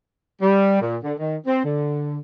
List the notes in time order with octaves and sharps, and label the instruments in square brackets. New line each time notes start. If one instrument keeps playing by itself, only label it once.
[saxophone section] G3
A#2
D3
D#3
C4
D3